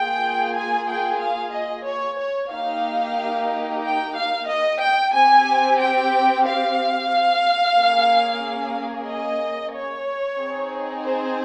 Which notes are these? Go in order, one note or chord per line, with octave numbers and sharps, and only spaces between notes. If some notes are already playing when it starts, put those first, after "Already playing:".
Already playing: A#3 F4 G#4 G5
G#5
G5
F5
D#5
C#5
C#5
A#3 D#4 G4 F5
G5
F5
D#5
G5
C4 G4 G#5
G5
F5
A#3 C#4 G#4
D#5
C#5
C4 D#4 G#4
C5